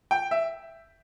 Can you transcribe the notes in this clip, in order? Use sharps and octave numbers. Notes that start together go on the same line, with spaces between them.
G5
E5